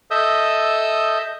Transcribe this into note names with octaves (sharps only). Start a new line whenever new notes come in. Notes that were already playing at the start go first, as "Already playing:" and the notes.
A4 D#5 E5 D#6 E6 G6